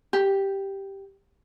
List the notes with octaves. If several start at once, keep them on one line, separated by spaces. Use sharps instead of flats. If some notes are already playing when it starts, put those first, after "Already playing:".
G4